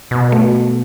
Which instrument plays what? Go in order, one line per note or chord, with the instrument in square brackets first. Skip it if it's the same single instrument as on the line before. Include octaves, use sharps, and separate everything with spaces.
[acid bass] B2
[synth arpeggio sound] A3